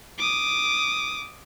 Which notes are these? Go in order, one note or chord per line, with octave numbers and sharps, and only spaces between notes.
D6 D#6